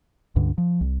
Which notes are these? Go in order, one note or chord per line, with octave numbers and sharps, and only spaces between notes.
C#2 G2 D3
F3
C2